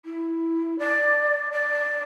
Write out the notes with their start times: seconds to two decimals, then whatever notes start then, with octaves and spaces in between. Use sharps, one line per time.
0.05 E4
0.79 D5
1.52 D5